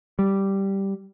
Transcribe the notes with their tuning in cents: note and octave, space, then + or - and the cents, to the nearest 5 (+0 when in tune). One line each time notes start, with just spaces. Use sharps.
G3 -5